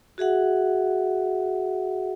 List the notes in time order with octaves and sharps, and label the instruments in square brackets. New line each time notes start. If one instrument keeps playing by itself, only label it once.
[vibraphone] F#4 G#4 E5 F#5